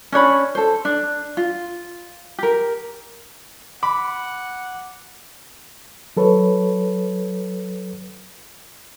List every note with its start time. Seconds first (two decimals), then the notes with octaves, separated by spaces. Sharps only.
0.12 C#4 D4 C#5 B5
0.55 A4 C5
0.85 D4
1.37 F4
2.38 G4 A#4
3.83 F#5 B5 D6
6.17 F#3 A4 B4 C#5